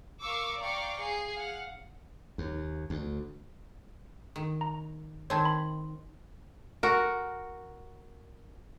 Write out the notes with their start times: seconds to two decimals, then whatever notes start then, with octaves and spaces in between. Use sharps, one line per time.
0.22 A#4 F5 C#6 D6 E6
0.60 D5 F5 G5 A#5 C#6 D6
1.00 G#4 C7
1.35 F5 F#5
2.38 D#2
2.90 D2
4.36 D#3
4.61 A#5
5.30 D#3 C4 C#5 A5 G#6
5.45 B5
6.83 F#4 A#4